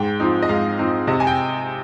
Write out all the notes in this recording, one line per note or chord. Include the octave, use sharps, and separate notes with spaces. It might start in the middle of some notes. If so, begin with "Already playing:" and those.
Already playing: G#2 G5
F3 C4 D#4
D#5
G#2 F5
F3 C4 D#4
C3 D#5
G#5
G5